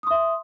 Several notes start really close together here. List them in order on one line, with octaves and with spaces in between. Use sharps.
D#6 C6 E5